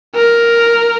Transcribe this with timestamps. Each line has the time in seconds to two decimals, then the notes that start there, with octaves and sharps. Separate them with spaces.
0.15 A#4